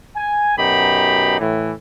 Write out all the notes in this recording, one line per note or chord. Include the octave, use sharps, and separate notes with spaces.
G#5
F#2 B2 D#4 G4 B5
A2 E3